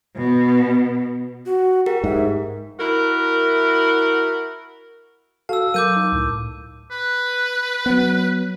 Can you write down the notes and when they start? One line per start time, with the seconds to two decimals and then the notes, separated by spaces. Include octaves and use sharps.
0.16 B2
1.46 F#4
1.86 G4 A#4 F#5
2.04 G#2 E5
2.80 E4 F#4 A#4
5.49 F#4 A4 F5 A5 E6
5.74 F#3 A#4 F5 D6 G6 D#7
5.96 D#4
6.12 C#2 A2
6.91 B4
7.86 F#3 B3